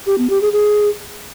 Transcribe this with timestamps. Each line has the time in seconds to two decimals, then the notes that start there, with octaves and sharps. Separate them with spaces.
0.07 G4
0.18 B3
0.30 G4
0.41 G#4
0.53 G#4